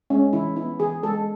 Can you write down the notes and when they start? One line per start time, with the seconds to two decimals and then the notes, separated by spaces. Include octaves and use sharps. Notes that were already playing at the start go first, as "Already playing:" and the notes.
0.10 G#3 C#4
0.33 E3 E4
0.56 B3 E4
0.79 E3 G#4
1.03 G#3 A4